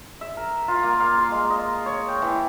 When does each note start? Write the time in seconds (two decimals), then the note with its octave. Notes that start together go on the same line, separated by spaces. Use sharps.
0.21 E5
0.37 A#4
0.68 F4
0.83 A#3
1.00 F5
1.18 C6
1.32 G#3
1.50 D#5
1.86 C#5
2.08 G5
2.22 E3